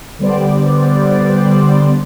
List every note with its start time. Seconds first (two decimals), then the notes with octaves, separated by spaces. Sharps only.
0.19 D3 G3 B3 C5 D5